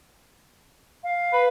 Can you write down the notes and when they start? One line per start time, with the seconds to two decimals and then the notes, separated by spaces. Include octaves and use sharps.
1.04 F5
1.33 B4